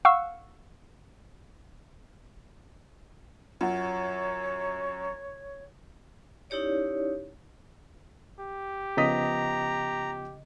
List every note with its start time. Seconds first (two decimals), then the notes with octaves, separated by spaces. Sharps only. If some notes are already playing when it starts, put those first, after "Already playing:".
0.05 F5 F#5 C#6 E6
3.61 F#2 F4 C#5 F#5
6.50 C#4 D#4 E4 G4 C#5 D5
8.40 G4
8.97 C#3 F3 B3 D#5 A#5 D#6 B6